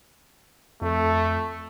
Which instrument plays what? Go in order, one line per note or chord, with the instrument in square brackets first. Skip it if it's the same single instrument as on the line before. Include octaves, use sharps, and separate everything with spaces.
[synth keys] F2 [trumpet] A3